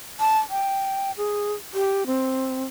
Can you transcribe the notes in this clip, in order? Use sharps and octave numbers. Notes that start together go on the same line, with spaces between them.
A5
G5
G#4
G4
C4